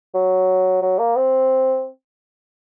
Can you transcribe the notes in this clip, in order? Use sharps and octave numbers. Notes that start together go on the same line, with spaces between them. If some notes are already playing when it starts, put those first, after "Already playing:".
F#3
F#3
A#3
C4